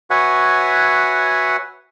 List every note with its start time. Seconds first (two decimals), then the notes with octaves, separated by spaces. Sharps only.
0.10 F#4 B4 C#5 E5 F#5 G#5